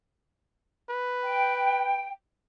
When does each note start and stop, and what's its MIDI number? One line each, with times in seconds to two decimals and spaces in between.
0.89 2.08 71
1.24 2.10 79